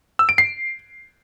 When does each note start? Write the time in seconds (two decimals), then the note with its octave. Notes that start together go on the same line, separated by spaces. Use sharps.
0.19 E6
0.29 D7
0.38 C7